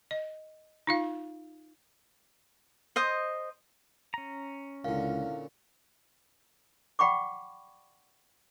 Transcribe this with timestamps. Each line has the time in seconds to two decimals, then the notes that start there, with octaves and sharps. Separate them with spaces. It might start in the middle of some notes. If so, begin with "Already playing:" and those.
0.11 D#5
0.87 D#4 F4 F5
2.96 C5 D#5 D#6
4.14 C#4 A#5
4.84 C#2 A#2 D3 E4 F5
6.99 D5 F#5 G5 B5 C#6 D6